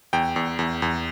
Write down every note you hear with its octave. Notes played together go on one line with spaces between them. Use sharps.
E2 G5
E2
E2
E2